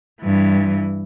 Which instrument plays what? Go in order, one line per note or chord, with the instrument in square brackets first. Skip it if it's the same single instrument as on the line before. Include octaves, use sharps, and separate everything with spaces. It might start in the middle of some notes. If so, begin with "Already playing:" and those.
[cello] G2 E3